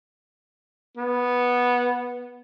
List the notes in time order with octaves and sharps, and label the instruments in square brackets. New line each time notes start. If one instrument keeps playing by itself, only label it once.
[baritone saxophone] B3